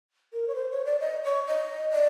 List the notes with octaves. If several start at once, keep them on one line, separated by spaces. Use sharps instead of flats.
A#4
C#5
C5
C#5
D5
D#5
C#5
D#5
D5